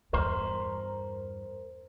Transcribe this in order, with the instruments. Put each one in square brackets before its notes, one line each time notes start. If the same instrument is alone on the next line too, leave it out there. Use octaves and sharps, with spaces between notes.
[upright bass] E2 G2 [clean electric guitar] A#4 C5